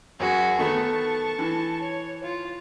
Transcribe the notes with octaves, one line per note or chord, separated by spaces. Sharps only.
F#2 F#4 G#4
D#3 A3 B3 A5 C#6
E3
C#5
F4